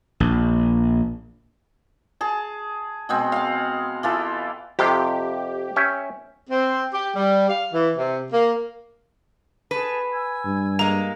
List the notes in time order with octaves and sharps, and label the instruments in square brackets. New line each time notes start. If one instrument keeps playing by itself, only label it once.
[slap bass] A#1
[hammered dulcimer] G#4 A5
B2 G#3 C4
F5 F#5
E3 F4 A4
[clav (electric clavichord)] F2 C3 F5 [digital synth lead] G4
[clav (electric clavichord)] C#4 E5 G5
[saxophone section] C4
G4
G3
F5
E3
C3
A#3
[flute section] G#4 A5 [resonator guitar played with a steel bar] B4
[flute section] G#5 E6 G#6
[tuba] G2
[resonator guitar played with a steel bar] G#3 A#3 [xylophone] A#5